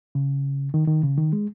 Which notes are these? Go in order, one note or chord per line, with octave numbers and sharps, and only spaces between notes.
C#3
D#3
D#3
C#3
D#3
G#3